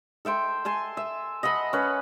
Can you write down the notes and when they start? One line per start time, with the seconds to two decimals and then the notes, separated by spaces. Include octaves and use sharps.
0.25 A4 E5 G5 C6
0.65 G#5 A5 C6
0.97 E5
1.43 D#5 F#5 A5 B5
1.73 C#4 B4